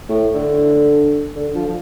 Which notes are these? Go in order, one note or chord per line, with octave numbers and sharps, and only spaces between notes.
A2
D3
D3
F3
F3